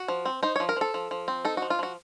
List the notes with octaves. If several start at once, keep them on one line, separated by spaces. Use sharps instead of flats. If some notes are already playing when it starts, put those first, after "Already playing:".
Already playing: F#4
F3
C4
D#4 C5
C#5
F3
A#4
F3 A4
F3
F3
C4
D#4 A4
F#4
F3
F4
F3 F#4